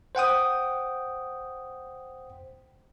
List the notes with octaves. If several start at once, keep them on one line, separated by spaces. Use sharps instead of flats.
C5 F#5 G5 D#6